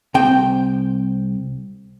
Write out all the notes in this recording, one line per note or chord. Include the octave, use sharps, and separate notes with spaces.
C2 C4 G5